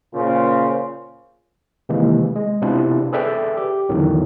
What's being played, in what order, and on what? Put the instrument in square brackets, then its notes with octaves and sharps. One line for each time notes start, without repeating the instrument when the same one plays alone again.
[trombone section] A#2 C#3 F4 A#4 C5
[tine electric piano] C3 D#3 E3 G#3 A#3
G#3
C3 B3 C4 D4 E4 F4
G#4 A4 B4 D5 E5 G5
G4
E2 A2 D3 D#3 F#3